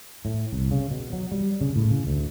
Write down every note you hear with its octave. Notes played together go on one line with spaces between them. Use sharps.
A2
C2
C#3
B2
F#3
G3
C#3
A2
C#3
D2